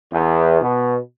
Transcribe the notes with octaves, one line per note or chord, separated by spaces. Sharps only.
E2
B2